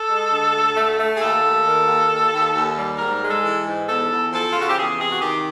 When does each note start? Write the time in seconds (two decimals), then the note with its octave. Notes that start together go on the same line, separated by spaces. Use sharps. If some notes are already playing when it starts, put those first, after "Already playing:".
Already playing: A4
0.09 G#3
0.31 D3
0.54 D2
0.76 A3
0.99 A3
1.16 G#4
1.20 D#2 A4
1.43 D#2
1.65 D#3
1.87 D#2
2.09 D#2
2.31 D#2
2.54 D#2
2.77 G3
2.98 G#2 A#4
3.21 G#3
3.29 A4
3.43 E3
3.65 G#2
3.87 E2 A4
4.10 E2
4.32 F3 A4
4.51 C#3 F4
4.60 F#4
4.68 G4
4.77 E2 G#4
4.98 C3 G#4
5.12 F#4
5.21 D#3 G4